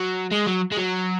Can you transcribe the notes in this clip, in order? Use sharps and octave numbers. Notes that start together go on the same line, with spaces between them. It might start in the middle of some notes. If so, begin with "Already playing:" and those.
Already playing: F#3
G#3
F#3
G#3
F#3